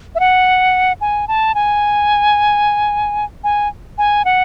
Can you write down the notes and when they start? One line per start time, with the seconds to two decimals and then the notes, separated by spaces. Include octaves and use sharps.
0.15 E5
0.20 F#5
1.01 G#5
1.28 A5
1.55 G#5
3.44 G#5
3.98 G#5
4.25 F#5